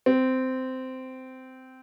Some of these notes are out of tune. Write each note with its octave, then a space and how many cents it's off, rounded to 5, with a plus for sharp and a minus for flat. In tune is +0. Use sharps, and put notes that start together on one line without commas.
C4 -15